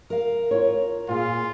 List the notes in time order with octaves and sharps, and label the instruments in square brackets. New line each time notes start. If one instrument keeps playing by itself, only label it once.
[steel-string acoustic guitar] A#4 F5
[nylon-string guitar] F4 C#5
[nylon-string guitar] A#2 G#4 [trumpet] F4